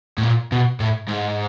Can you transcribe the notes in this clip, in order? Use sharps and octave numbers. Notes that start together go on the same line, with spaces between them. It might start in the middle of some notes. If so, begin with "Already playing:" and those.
A2
A#2
B2
A2
G#2